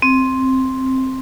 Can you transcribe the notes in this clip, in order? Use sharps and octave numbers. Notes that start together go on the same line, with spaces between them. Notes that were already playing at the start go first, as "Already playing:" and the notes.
C4